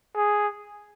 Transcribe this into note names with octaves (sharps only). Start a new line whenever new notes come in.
G#4